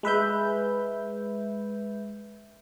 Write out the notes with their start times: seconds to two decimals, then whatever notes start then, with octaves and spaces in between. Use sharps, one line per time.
0.03 G#3 B4 E5 G6